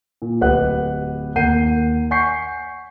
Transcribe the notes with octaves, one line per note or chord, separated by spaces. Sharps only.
A#2
D1 G4 B4 D#5 F#5 F#6
D#2 A#4 F#5 G6 C7 D#7
F#5 G#5 C#6 G6 B6 C7